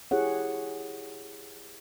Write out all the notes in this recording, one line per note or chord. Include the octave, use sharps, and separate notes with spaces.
E4 G4 G#4 C#5 F#5